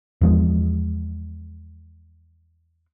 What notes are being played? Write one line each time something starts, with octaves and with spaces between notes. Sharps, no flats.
E2 F3 G#3